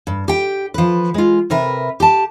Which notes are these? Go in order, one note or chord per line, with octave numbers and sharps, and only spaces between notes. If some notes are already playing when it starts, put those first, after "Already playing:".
G2
G4 G5
F3 B4
G#3 F4
C3 A#4 B4 E5
G4 A5